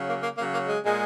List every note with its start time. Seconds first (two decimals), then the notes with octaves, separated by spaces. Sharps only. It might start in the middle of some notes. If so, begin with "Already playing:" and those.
Already playing: C#3 F#3
0.09 A#3
0.22 A#3
0.38 C#3 F#3 A#3
0.53 A#3
0.68 G#3
0.84 A#2 G#3